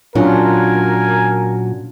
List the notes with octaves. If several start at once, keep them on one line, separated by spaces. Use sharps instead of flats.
A#2 F#3 C#4 D4 F4 A#4 G#5